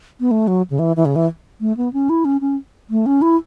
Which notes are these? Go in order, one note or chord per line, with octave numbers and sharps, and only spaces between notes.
B3
A3
F#3
C#3
E3
E3
C#3
E3
A3
B3
C#4
E4
C#4
C#4
A3
C#4
E4